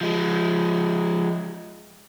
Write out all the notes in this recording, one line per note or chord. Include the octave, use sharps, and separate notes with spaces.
F3 G#3